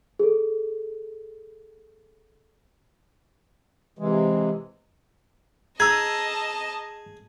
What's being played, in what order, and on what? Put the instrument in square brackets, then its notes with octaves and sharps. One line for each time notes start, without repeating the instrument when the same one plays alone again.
[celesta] G#4 A4
[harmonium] C3 E3 G#3
[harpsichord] G#4 [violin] D#5 A5 [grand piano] A#5 E6 [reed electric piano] G#6